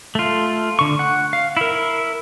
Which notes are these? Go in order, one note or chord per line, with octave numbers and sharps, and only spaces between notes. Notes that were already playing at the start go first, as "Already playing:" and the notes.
A3 F4
D3 C#6
F#5
F5
E4 A#4